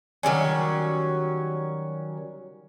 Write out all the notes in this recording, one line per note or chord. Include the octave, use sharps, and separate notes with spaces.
D#3 F#3 G3 C#4